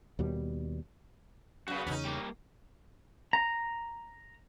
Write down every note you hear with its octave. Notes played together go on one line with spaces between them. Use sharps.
D#2 B2 G3
F#2 C#3 F#4 B4
E2 C#3 C#4 D#4
G3 A#3
A#5